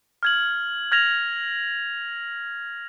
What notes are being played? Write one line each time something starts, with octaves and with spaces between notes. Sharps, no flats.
F6 G#6 F#7
F6 G#6 A#6 F7